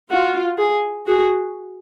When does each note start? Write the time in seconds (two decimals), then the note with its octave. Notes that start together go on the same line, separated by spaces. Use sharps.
0.11 F4 F#4
0.58 G#4
1.07 F#4 G#4